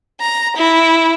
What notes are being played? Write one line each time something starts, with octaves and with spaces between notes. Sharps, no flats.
A#5
E4